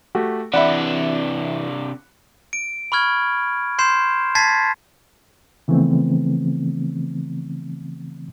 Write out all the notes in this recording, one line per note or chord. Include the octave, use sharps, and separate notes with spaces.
A3 F#4 G4
C3 E3 D4 D5 E5 F#5 B5
D7
B5 C#6 F6 G#6
C6 G6 C7 E7
A5 G#6 A6 B6 C7
C#3 E3 F3 A3 B3 C4